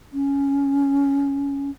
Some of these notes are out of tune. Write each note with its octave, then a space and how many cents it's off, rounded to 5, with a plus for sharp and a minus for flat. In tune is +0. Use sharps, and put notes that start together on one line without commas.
C#4 +10